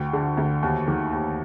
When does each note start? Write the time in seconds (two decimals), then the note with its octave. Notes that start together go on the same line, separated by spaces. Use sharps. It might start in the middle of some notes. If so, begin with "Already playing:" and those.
Already playing: D2 G5
0.13 D3
0.37 D2
0.62 D#2
0.88 D#3
1.13 D#2